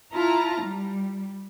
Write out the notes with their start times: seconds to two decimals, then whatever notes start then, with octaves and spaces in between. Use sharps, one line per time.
0.13 E4 F4 A5 A#5
0.63 G3